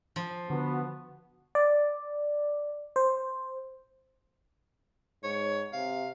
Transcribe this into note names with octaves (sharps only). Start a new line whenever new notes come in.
F3
D3 B3 F#4
D5
C5
G#2 C#5
C3 F5